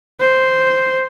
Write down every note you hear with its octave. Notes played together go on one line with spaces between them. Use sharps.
C5